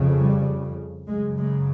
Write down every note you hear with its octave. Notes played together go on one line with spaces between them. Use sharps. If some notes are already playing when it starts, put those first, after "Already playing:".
Already playing: F2 C#3
G3
F#2 C#3 G#3
G#3